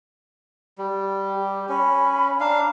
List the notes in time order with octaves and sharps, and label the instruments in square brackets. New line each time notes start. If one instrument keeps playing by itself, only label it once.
[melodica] G3
[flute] G4
[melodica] C#4 [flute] B5
[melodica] D4 F5 [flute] A#5